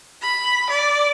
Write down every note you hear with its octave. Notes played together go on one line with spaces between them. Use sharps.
B5
D5